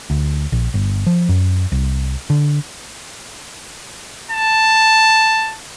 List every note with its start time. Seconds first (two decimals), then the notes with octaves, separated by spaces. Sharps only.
0.10 D2
0.52 A#1
0.74 G1
1.07 F3
1.29 F#2
1.72 C2
2.30 D3
4.31 A5